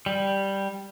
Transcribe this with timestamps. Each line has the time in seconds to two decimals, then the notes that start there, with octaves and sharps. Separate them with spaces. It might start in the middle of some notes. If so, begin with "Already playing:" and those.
0.06 G3